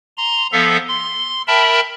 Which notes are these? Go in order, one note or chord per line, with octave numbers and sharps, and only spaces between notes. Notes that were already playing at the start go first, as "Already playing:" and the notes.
A#5 C6
F3 B3 A4 E5 F5
C6
A#4 E5 G5 A5 B5